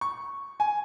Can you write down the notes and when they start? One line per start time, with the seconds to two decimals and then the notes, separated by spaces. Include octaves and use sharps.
0.01 C#6
0.60 G#5